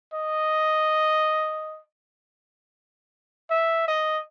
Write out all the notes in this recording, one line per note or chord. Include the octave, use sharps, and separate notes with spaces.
D#5
E5
D#5